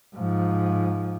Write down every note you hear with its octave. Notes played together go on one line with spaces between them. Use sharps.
G#2 F3